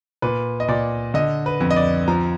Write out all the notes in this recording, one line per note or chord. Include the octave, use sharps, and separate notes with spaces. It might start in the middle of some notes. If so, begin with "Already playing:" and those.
A#2 B4
D#5
A#2 D5
D3 D#5
B4
F2
D#5
D5
F3 A#5